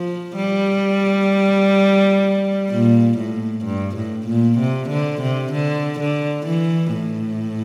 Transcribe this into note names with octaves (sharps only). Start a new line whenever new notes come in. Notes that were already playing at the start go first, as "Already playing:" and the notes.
Already playing: F3
G3
A#2
A2
G2
A2
A#2
C3
D3
C3
D3
D3
E3
A2